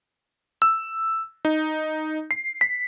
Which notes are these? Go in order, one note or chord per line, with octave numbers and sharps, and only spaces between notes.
E6
D#4
C7
B6